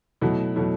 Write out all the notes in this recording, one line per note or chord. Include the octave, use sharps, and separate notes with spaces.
B2 F#3 A3 E4
B2 F#3 A3 E4